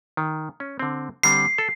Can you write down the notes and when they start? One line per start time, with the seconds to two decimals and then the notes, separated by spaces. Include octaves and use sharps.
0.17 D#3
0.60 C#4
0.79 D3 C4
1.23 D3 G3 C4 C7
1.58 A4